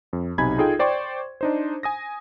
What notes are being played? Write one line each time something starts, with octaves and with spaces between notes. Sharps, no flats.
F2
B1 C3 D#4 G#5 B5 G#6
D#4 F4 G#4 A4 G5
C5 D5 G5 C6 C#6
D4 D#4 C5
G#5 D#6 A#6